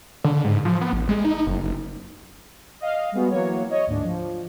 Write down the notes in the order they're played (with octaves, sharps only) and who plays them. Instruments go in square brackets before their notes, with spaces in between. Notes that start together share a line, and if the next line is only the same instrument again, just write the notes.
[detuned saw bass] D3
G#2
F3
B3
A1
G#3
D#4
F#1
F#1
[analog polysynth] D#5 F5
G3 G#3 B3 F#4
E3 F#3 A#3 C#5
C#5 D#5
D2 G#2 D4
F3